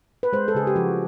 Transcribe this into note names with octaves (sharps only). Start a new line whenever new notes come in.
B4
G#3 C5
A4
C#3 G#4
G4
F3 F#4